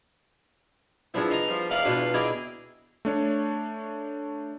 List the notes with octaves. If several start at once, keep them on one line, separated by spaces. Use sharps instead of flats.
F3 B3 D4 E4 G#4
D#4 A#5
F3 G3
E2 D#4 E4 D5 F5
B2 B3 D4 F4
D#4 E4 G#4 D5 D#5 G5
A3 D4 C#5